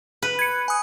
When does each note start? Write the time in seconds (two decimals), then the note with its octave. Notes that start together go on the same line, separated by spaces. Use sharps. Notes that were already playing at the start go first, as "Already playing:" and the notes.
0.22 B4
0.39 G#6 C#7
0.68 G#5 D#6